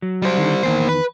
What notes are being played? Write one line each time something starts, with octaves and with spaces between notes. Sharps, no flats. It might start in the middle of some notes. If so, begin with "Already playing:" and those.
F#3
G3 C5
D3 D#3
E2 D#3 A#3 C5
B4